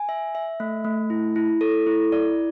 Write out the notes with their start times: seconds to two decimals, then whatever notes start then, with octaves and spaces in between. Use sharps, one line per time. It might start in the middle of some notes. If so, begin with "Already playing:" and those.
Already playing: G#5
0.09 E5
0.35 E5
0.60 A3
0.84 A3
1.10 E4
1.36 E4
1.61 A4
1.87 E4
2.12 D5